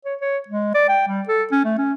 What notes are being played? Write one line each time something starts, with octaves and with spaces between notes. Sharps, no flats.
C#5
C#5
G#3
D5
G5
G3
A4
C#4
A3
C#4